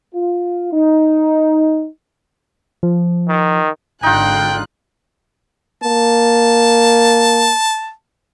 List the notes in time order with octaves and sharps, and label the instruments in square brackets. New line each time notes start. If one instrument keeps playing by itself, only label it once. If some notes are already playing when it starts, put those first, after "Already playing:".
[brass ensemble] F4
D#4
[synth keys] F3
[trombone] D#3
[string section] G#1 D3 F#6 [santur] D#4 F4 [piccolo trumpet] G5
[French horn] A#3 [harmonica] A5